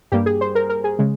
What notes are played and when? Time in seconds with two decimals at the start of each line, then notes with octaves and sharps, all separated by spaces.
0.12 G2 G3 A#3 G4
0.26 G#4
0.41 C5
0.55 A#4
0.69 A#4
0.84 G#4
0.99 C#3 G#3